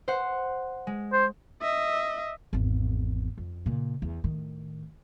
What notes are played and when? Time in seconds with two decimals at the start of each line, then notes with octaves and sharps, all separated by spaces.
0.08 C5 F#5
0.87 G#3
1.13 C5
1.62 D#5 E5
2.53 G#1 E2
3.38 F2
3.66 A#2 C#3
4.02 E2
4.24 A2 D#3